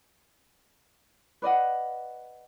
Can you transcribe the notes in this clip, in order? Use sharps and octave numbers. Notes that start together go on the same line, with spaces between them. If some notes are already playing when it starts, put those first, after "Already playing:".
B4 D5 D#5 F#5